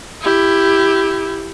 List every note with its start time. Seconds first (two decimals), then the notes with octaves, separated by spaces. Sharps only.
0.21 E4 G4